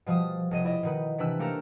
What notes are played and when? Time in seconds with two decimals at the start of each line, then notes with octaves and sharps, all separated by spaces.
0.06 B2 F3 G3 D#6
0.51 F1 D#5 D#7
0.64 E4 D5 D#5
0.83 B2 D#3 B4
1.18 C3 E3 D4 B4 E6 F#6
1.39 A3 A#3 G4 A4 A#4